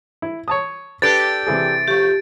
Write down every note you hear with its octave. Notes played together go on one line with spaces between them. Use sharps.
E4
C#5 A5 D#6
D4 G4 A4 B4 A6 D7
C3 E3 G#4
F3 A3 G4